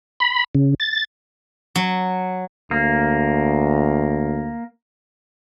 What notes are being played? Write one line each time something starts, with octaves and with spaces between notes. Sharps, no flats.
B5
C#3
A6
F#3
D2 A#3